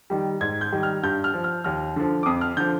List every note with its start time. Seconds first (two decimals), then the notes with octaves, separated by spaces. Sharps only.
0.10 D#3 G3
0.41 G#2 G#6
0.61 G6
0.72 D#3 G3
0.83 F6
1.03 G2 G6
1.24 F6
1.34 F3
1.44 F6
1.64 D#2 F6
1.96 D3 F3
2.23 D6
2.26 F2 D#6
2.41 F6
2.57 D3 F3 G6